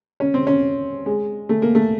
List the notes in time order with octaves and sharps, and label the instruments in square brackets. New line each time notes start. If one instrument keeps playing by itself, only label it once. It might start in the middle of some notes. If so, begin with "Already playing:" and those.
[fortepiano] C#4
C4
C#4
G#3
A3
A#3
A3